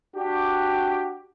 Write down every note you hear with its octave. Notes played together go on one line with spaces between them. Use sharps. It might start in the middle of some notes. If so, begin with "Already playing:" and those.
D4 F#4 G4